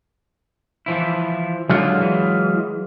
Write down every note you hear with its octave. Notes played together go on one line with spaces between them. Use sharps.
E3 F3 E4
D3 F#3 G#3 F4
E3